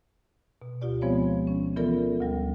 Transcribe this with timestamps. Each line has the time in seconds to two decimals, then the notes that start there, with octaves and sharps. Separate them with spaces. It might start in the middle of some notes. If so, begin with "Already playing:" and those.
0.62 B2
0.81 D2 B2 F4 G4 D5
1.01 F3 G#3 B3 C4 C5 C#5
1.47 C#4
1.76 E3 B3 F4 A4 A#4 D5
2.20 D2 G3